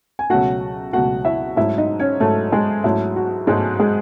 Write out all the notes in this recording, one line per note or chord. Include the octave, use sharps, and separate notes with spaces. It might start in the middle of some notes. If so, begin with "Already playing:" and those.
G#5
C#2 B2 F#3 A3 F#4 F#5
C#2 B2 F#3 A3 F#4 F#5
E4 E5
G#2 F#3 A3 E4 E5
D#4 D#5
C#4 C#5
G#2 F#3 A3 A4
G#3 G#4
G#2 F#3 A3 E4
F#4
G#2 F#3 G#3 A3 G#4
G#3 G#4